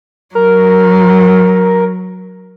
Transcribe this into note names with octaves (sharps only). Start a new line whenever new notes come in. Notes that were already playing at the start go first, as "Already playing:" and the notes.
F#3 A#4